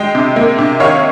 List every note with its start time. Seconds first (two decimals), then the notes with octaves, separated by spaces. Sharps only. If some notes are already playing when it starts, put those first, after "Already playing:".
Already playing: G#3 D#5 G5
0.15 C3
0.36 A#3
0.58 C3
0.80 D#3 C#5 F5